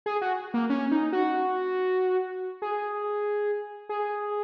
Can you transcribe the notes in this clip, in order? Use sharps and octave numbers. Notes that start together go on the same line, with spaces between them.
G#4
F#4
A#3
C#4
D#4
F#4
G#4
G#4